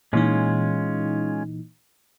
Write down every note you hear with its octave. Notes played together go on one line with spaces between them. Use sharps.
A#2 E3 G#3 C#4 D#4 F4